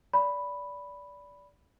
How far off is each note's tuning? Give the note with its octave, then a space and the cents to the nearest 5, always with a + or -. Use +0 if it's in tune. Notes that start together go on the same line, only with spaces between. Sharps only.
D5 -20 B5 +0